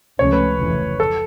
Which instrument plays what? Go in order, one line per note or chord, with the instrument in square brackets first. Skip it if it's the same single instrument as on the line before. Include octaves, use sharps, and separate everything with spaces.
[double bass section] C#2 C3 F3 A3 C#4 [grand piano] C#5
[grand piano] B4
[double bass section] F1 F2 C#3 E3
[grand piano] A4